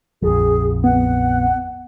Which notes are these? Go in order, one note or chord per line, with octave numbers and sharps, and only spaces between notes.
A#1 F2 F3 G#4
B3 F#5